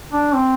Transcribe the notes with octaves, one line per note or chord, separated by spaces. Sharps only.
D4
C4